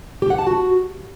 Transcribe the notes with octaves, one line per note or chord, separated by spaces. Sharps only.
G4
F#5
A5
F#4